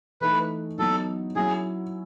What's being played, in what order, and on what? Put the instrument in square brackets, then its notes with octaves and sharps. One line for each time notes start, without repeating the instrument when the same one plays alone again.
[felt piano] E3 A3 D#4 [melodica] B4
[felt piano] F#3 B3 D#4 [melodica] A4
[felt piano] F#3 C#4 E4 [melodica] G#4